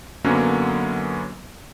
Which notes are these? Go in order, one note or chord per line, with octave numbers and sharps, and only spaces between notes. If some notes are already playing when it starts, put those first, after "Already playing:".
F#2 D3 F#3 A#3 B3 C#4